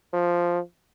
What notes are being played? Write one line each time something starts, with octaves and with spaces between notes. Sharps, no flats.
F3